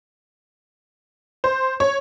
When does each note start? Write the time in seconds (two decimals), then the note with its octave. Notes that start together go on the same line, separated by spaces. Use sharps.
1.44 C5
1.80 C#5